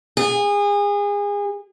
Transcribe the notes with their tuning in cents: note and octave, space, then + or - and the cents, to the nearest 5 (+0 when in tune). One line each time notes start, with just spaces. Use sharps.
G#4 -30